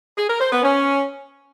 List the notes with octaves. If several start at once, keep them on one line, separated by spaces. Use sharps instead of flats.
G#4
A#4
C5
B3
C#4